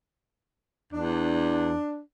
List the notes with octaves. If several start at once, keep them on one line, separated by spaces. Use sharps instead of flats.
E2 D4